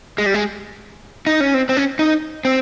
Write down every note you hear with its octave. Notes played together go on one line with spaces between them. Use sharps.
G#3
G3
G#3
D#4
C#4
C4
C4
C#4
D#4
C4